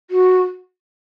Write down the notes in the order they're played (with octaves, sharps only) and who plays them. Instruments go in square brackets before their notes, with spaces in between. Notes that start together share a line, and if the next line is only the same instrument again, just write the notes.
[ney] F#4